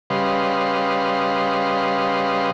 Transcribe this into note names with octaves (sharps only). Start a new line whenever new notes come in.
C#3 G3 B4 D#5 F5 C6